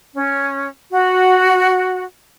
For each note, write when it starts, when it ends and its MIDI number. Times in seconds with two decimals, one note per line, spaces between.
0.14 0.67 61
0.91 2.03 66